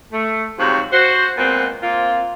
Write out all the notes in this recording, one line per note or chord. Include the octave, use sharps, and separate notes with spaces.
A3
G#2 C3 F3 F#3 C4 F#4
F#4 C5
A#2 G#3 B3 C4
A#3 C4 F4